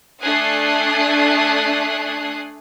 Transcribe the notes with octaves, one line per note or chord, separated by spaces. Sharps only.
A3 D4 G#5 D#6 F#6 C7